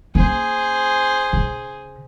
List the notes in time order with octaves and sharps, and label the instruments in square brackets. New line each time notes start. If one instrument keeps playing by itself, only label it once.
[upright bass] A#3 C#4 [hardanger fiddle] G#4 C5
[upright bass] C#3